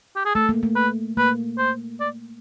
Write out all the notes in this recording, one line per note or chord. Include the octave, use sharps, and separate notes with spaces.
G4
G#4
A3 A4
A#3
A3
B4
A#3 B4
C5
D5